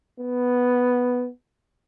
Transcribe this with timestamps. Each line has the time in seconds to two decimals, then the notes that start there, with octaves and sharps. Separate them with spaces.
0.20 B3